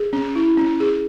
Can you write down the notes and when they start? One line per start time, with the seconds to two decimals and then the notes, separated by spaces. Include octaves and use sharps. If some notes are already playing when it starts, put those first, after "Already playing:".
Already playing: G#4
0.13 C#4
0.36 E4
0.57 C#4
0.80 G#4